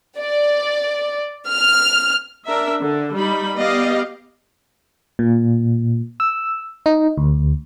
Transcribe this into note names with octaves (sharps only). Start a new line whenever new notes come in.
D5
F6
D4 A#4 E5
D3
G3 D#4 B5
B3 G4 D5 D#5 F5
A#2
E6
D#4
D2